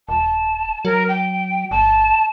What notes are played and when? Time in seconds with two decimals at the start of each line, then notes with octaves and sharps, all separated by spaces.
0.09 D#1 A5
0.85 F#3 A#4
1.09 G5
1.71 G1 A5